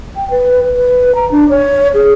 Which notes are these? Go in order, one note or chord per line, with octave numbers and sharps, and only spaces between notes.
G5
B4
B4
A#5
D4
C#5
G#4